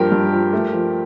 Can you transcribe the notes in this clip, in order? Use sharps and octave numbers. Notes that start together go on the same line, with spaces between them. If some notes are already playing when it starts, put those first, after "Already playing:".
Already playing: G2 F3 G4 A#4
G2
F3
A3
F3